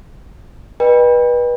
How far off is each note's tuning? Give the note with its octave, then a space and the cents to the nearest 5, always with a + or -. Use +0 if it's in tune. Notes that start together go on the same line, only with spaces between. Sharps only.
B4 -25 D#5 -45 G5 +30